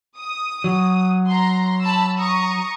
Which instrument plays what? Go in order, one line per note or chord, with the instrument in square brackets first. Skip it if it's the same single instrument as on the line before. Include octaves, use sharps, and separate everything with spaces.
[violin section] D#6
[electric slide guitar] F#3
[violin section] A#5 C6
A5 B5 E6
A#5 C#6 D#6